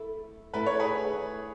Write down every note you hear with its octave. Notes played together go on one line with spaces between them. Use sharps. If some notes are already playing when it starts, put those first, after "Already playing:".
Already playing: A3 E4 A4
A3 E4 A4 B4
C#5
G#4 B4